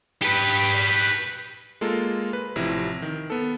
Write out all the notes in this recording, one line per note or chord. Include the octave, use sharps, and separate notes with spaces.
G4 B4
G#3 A#3 F4 A4 A#4
B4
A1 C3 F3 E4
D#3
B3 A4